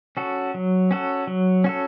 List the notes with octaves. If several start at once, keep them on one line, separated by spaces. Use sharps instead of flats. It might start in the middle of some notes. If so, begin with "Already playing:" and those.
C#4 F#4 A4
F#3
C#4 F#4 A4
F#3
C#4 F#4 A4